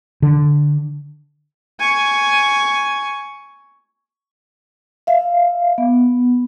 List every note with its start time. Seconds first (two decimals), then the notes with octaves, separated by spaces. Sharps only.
0.22 D3
1.80 G#5 C#6
5.07 E5 F5
5.78 B3